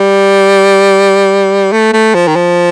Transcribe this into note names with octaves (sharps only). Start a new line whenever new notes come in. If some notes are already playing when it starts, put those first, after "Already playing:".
Already playing: G3
A3
A3
F3
D#3
F3